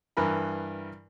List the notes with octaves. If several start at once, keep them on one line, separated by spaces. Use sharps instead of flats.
G2 E3 A#4 B5